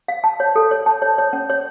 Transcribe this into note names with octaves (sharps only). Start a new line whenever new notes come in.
F5
A5
C#5
A4
C#5
A5
C#5
C#5
C#4
C#5